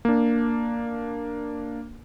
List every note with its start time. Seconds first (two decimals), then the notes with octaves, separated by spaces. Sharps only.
0.05 A#3 D4